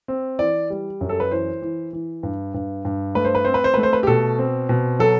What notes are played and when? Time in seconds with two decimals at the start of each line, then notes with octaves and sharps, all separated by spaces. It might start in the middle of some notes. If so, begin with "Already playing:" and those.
0.08 C4
0.39 E3 D5
0.70 G3
1.01 F#2
1.09 A4
1.20 B4
1.31 E3 C5
1.62 E3
1.93 E3
2.23 G2
2.54 G2
2.85 G2
3.15 A3 B4
3.25 C5
3.35 B4
3.45 C4 C5
3.54 B4
3.64 C5
3.74 A3 B4
3.83 C5
3.93 B4
4.03 G4
4.07 B2 A4
4.39 C4
4.69 B2
4.99 F#3 A4